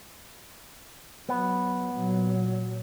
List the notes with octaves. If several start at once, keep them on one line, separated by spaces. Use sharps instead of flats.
F#3 B3
A#2 F#3